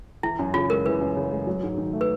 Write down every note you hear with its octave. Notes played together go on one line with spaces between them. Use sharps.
E3 E4
F#2
C#3 F4
G#3 A#4
E3 B4
F#2
C#3
G#3
F#3
G#2
D#3
A3
B4